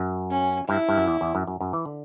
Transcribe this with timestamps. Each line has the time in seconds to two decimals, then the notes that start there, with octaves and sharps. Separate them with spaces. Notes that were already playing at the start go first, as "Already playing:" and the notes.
Already playing: F#2
0.30 C#4
0.69 G2 E4
0.89 G2
0.98 F#2
1.07 E2
1.21 E2
1.35 F#2
1.47 F#2
1.61 F#2
1.73 E3
1.85 D3